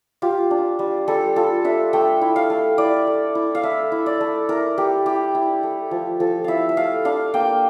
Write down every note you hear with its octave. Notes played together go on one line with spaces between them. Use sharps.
F4 G4
D4
G3
G3 A4
F4 A4
D4 E5
A3 G5
E4
F5
A3
E4 D5
A3
E4
F5
A3 E5
E4
D5
A3
E4 A#4
A3 G4
E4 G4
E4
A3
F3
F3 A4
E4 E5 F5
E5
A3 F5
D4 F5
A#3 G5